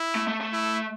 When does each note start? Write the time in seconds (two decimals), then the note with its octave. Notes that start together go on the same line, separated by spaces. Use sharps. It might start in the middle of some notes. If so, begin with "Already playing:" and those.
Already playing: E4
0.15 A3
0.27 A3
0.41 A3
0.53 E4